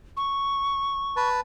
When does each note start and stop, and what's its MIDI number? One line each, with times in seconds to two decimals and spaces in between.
0.17 1.29 85
1.16 1.40 71
1.16 1.40 81